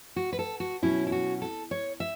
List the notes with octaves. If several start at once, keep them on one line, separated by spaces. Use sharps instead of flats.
F#4
B4
A4
F#4
B2 F#3 C#4 E4
E4
F#4
A4
C#5
E5